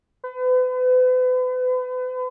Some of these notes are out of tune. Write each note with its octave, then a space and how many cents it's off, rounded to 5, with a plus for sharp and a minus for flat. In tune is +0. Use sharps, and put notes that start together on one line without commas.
B4 +40